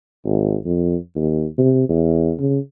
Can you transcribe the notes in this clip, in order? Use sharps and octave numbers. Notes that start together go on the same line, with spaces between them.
G#1
F2
D#2
C3
E2
C#3